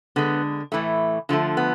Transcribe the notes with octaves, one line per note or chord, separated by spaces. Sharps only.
D3 G#3 B3
A2 E3 A3
D3 F3 A3
B3